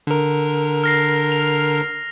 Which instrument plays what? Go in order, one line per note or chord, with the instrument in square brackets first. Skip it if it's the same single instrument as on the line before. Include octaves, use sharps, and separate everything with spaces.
[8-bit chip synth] D3 A#4
[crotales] F6 A#6 C7
F7